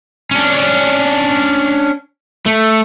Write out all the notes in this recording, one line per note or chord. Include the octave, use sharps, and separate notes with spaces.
C#4 D4
A3